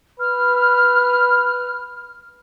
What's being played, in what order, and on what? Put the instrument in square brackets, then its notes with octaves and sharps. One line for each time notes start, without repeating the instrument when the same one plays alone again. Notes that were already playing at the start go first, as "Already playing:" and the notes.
[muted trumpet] B4 [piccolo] F6